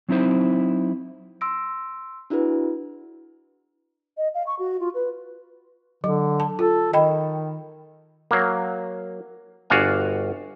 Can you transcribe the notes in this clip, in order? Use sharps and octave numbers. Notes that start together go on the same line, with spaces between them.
F#3 C4 D#4 E4 C5
C6 E6 A#6 D7
D4 E4 F#4 G#4 B4
D#5
F5
C#6
F#4
F4
B4
D3 F#3
A5
F4 A4
D#3 D#5 G5 B5
F#3 A#3
G1 F#4 D5 F5 G#5